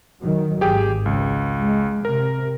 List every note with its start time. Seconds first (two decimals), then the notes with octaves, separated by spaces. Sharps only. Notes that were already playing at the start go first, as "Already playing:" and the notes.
0.18 D#3 F#3
0.61 G#1 G4 G#4 G5
1.06 C#2
1.59 G#3
2.05 C3 A#4